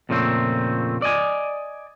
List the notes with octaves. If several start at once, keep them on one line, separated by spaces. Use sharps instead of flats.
F2 A#2 C#3 A3 C4
D5 D#5 G#5